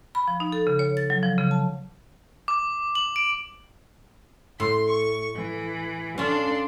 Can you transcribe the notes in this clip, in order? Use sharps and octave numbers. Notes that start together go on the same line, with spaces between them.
B5
F3
D#4
A4
C#3
C#5
A6
F#3
F3
C#3
A5
D6
F#7
D7
A2 C6
C#6
E3
C#4 D4 F4 A4 C6